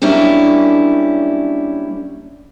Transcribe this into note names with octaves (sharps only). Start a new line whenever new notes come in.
F#3 G3 A#3 C#4 D4 E4